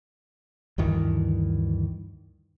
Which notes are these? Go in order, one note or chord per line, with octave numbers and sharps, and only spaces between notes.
D2 G2 D#3 E3